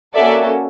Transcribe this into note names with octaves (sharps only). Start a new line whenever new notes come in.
A#3 C#4 F#4 A4 D5 E5